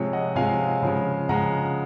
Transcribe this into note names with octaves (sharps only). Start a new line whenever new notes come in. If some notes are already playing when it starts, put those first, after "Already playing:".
Already playing: C3 F3 G#3 C#5
D#5 F#5
C3 F3 G#3 F5 G#5
C#3 F3 G#3
C#3 F3 G#3 F#5 A#5